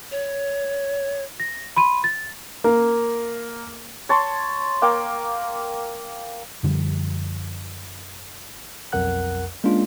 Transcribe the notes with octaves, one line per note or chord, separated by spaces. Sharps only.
C#5
A#6
B5 C6 D#7
A6
A#3
C#5 A5 C6
A#3 G5 D6
F#2 D3 F3 G3
B1 F2 A#4 F#5 F#6
G#3 A#3 C#4 D4 F4